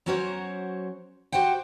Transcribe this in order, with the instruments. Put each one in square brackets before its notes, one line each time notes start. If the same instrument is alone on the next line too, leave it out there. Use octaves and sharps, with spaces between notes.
[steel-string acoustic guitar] F#3 C#4 F#4 A#4 C5 C#5
F#4 G4 C5 F#5 G5